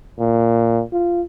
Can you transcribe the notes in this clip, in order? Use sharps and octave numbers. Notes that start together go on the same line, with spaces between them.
A#2
F4